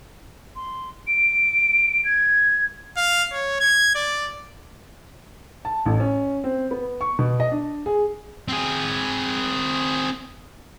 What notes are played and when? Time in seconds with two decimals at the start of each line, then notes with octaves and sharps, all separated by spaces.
0.56 C6
1.07 D7
2.05 G#6
2.97 F5
3.32 C#5
3.61 G#6
3.95 D5
5.65 A5
5.86 A1
6.00 C#4
6.44 C4
6.71 B3
7.01 C#6
7.19 B2
7.40 D#5
7.52 D4
7.86 G#4
8.48 C4 G#4